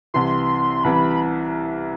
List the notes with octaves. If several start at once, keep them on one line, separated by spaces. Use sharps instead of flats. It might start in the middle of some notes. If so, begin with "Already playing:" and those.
C2 C3 E3 C6
C2 C3 E3 B5